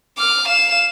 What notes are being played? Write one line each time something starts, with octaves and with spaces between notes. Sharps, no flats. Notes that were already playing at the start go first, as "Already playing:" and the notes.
D6 F6
F5 E7